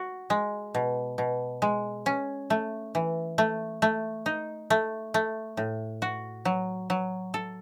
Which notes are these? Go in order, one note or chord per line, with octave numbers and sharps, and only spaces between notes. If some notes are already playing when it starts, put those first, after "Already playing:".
Already playing: F#4
G#3
B2
B2
G#3
C#4
A3
E3
A3
A3
D#4
A3
A3
A2
F#4
F#3
F#3
A4